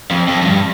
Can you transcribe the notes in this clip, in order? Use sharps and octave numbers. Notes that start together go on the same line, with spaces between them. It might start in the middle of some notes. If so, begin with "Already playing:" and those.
F2
F2
F2
G2